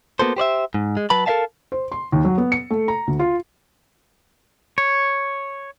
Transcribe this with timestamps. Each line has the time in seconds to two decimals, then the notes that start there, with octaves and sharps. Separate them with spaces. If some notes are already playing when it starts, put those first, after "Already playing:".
0.19 A#3 B3 F#4 A4 C5
0.37 G4 C5 D5 E5
0.74 G#2
0.97 G#3
1.10 F#3 B4 A5 B5
1.26 A4 A#4 C5 E5 F5 A5
1.72 C5
1.92 C6
2.12 D#2
2.25 F#3
2.38 B3
2.52 C#7
2.70 A3
2.88 A#5
3.07 D2
3.19 F4
4.78 C#5